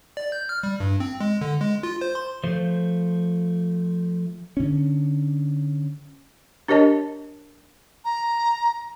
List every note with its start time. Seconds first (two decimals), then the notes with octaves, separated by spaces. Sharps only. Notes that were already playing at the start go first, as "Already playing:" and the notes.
0.17 D5
0.32 G6
0.49 F6
0.63 G3
0.80 G2
1.00 C4
1.21 G#3
1.41 D3
1.61 G#3
1.83 F4
2.01 C5
2.15 C6
2.44 F3 A3 C5
4.57 D3 C#4
6.68 D4 G4 A#4 C#5 D#5 A5
8.05 A#5